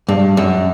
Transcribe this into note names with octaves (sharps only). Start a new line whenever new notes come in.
G2
F#2